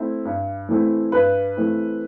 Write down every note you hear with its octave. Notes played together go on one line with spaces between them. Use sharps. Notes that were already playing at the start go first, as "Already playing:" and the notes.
Already playing: A3 C4 E4
G2
E3 A3 C4 E4
G2 B4
E3 A3 C4 E4